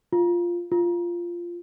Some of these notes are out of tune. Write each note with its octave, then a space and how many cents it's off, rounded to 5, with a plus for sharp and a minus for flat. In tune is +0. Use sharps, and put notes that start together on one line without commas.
F4 -5
F4 -10